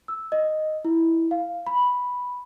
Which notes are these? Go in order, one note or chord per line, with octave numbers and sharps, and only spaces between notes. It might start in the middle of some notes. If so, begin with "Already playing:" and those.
E6
D#5
E4
F5
B5